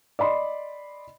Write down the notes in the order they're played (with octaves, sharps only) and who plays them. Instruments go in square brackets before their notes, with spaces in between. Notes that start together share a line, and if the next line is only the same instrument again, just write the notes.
[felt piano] D5 D#5 B5 C6